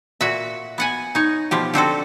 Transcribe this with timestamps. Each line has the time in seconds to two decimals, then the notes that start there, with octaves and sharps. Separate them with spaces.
0.21 A#2 F#4 E5
0.78 B3 F#5 G#5
1.15 D#4 C#5
1.51 B2 F3 G4
1.74 D3 C4 F#4 A4